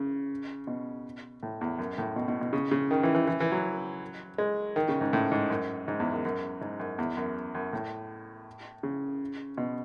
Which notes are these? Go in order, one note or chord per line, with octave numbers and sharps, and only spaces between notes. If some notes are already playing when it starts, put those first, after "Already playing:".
Already playing: C#3
B2
A2
E2
F#2
A2
B2
B2
B2
C#3
C#3
D#3
E3
E3
E3
E3
F#3
G#3
D#3
C#3
G#2
A2
G#2
F#2
G#2
E2
F#2
F#2
G#2
F#2
E2
F#2
F#2
A2
C#3
B2